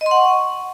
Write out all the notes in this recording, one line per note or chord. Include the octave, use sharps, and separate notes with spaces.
D#5
C6
F#5
C#6